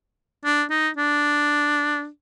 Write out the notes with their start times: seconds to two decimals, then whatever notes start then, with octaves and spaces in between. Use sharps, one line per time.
0.45 D4
0.70 D#4
0.97 D4